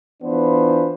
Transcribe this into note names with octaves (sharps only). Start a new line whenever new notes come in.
E3 B3 D4 F4 B4 C5